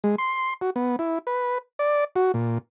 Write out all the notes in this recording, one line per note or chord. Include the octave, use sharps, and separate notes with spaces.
G#3
C6
F#4
B3
E4
B4
D5
F#4
A#2